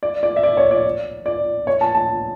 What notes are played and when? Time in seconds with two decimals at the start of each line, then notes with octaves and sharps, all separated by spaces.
0.03 D5
0.23 D5
0.36 E5
0.43 D5
0.57 C#5
0.71 D5
1.26 D5
1.67 C#5
1.81 A5
1.95 A5